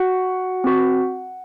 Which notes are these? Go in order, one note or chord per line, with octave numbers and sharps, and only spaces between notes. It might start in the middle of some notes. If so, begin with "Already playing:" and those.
Already playing: F#4 F#5
C4 F#4